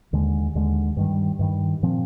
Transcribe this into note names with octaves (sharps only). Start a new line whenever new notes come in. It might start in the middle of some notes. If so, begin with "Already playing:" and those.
D#2 D3 G#3
D#2 D3 G#3
G2 D#3 G3
G2 D#3 G3
A#2 F3 C4